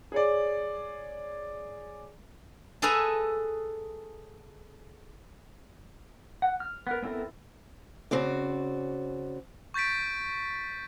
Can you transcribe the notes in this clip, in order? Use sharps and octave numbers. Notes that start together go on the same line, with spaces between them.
G#4 C#5 D5
G#4 A4 B4 E5 G#5 A#5
F#5
F6
B3 A#4
B3 C4 E4 A4 A#4
C#3 C4 F#4 D5
C#6 G6 A6 B6 D7